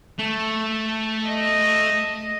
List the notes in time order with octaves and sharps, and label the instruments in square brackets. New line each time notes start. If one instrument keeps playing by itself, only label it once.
[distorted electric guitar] A3
[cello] D#5